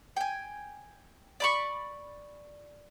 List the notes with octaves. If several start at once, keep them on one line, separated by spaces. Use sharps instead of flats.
G5 G#5
D5 B5 C#6